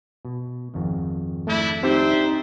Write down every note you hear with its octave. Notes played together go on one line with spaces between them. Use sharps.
B2
G#1 F2 D#3
A3 D4 E4
C4 D4 D#4 G4 C5 E5